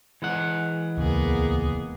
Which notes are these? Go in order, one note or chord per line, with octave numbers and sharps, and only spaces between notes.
E3 G#3 F#5
D#1 C#2 A#3 B3 G#4